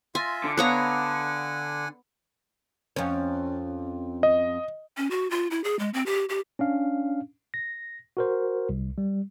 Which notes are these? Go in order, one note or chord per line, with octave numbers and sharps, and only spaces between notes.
F4 E5 G#5 C6 A6 A#6
D3
B3 C#5 F5 F#5 G#5 A#5 D#6 F#6
F2 C#4
D#5
C#4
F#4
F4
E4
G#4
G#3
C4
G4
G4
C#4 D4 F5
A#6
F#4 A#4 C5
C2
G3